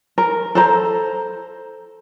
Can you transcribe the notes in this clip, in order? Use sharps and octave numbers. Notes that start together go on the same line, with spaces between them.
A#4
A4 C5 A#5